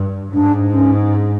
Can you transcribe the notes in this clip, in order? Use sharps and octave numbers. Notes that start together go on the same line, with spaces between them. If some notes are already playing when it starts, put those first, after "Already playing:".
Already playing: G2
G#2 D4
C#4